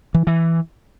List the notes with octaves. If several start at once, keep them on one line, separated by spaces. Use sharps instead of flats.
E3
E3